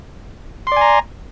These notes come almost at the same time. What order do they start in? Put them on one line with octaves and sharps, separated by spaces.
C6 D5 G#5 A#5